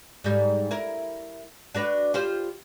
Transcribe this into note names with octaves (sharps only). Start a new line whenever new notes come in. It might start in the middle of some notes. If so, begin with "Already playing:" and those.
G#2 G3
E4 A#4
D4 F#4 B4
F4 G4 C5